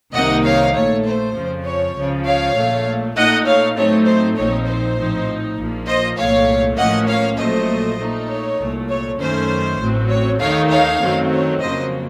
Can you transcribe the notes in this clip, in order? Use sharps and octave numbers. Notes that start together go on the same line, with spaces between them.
C2 C3 D#3 A#3 D#4 D#5 F#5
C#5 F5
A#1 A#2 A3 C#5
C5
F2 C#3 F3
C#5
C#2 C#3 F3
C#5 F5
A#1 A#2 A3
A#2 A3 D#4 D#5 F#5
C#5 F5
A2 F#3 A3 C4 D#4 C#5
C5
A#1 A#2 F3 C4 D#4 C#5
C5
A2 F3 C4 D#4
A#1 A#2 F3 A#3
C5 D#5
C2 A#2 A3 C#5 F5
A1 A2 F3 A#3 C#4 D#5 F#5
C#5 F5
A#1 A#2 F#3 A3 C5 D#5
A#2 A3 D#4
C#5
C2 A#2 A3
C#5
F#2 D#3 A3 C#4 C5
A1 A2 F#3 C4
C#5
D#2 D#3 A3 D#4 C#5 F5
C#5 F5
F#2 D#3 F#3 A3 C4
C#5
F2 C#3 F#3 A#3 C5 D#5